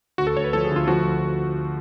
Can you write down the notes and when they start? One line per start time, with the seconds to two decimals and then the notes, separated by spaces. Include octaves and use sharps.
0.18 D2 F#4
0.27 A4
0.36 D2 C#5
0.44 B4
0.53 F3 A4
0.65 G#4
0.71 D2
0.76 F4
0.87 F3 F#4